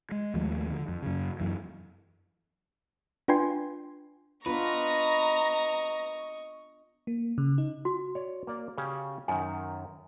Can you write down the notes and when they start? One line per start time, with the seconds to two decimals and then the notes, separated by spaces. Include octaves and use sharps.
0.11 G#3
0.34 D#2 F3 G#3 A3
0.70 D3
0.88 F2
1.02 F#2 C#3
1.40 F#2 E3
3.28 D4 F4 B4 G5 G#5 C6
4.46 B3 D4 F4 B4 D#5 A#5 C#6 A#6
7.07 A#3
7.38 C#3
7.58 D#4
7.85 F#4
8.15 C#5 D5
8.47 A#3 D5
8.78 C#3 C#4 G4
9.28 F#2 D#3 G#5